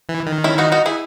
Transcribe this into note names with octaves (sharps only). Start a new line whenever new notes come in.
E3
D#3
C#4 E4
D#4 F#4
D#4 F#4
E4 G#4